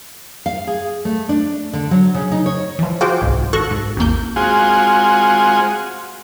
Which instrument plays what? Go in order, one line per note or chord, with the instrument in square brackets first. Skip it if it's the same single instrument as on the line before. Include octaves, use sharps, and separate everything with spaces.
[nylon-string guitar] F5
G#4
A3
D4
D3
F#3
C#3
D#4
C#5
[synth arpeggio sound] E3 F3
F4 F#4 G#4 C5 G5 D6
G1 C2 G#2
G#1 F#4 A4 C#6 F#6 A#6
G#2
A1 E2 A#3 G6
[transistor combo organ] G#3 C4 F4 F#4 G#4